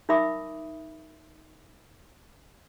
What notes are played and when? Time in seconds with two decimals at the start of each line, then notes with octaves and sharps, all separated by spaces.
0.09 D#4 A#4 E5 B5 D6 D#6